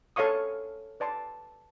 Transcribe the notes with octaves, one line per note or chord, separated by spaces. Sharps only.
A4 C#5 F5 C#6 D#6
B4 D5 A5 C6